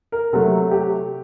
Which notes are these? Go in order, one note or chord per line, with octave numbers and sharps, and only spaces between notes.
A#4
C3 F#3 A3 A4
G4